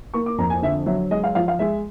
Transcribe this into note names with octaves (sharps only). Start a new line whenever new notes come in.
A#3 C#6
D6
F2 A#5
G#5
D3 E5
F#3 E5
G#3 D#5
F5
F3 F5
F5
G#3 E5